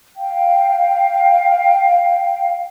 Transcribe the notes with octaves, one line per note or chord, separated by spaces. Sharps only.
F5 G5